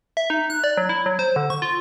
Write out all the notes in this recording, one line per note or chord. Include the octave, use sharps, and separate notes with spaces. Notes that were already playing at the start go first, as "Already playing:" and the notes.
E5
D#4
F#6
D5
F#3
E4
F#3
C5
D3
C#6
F4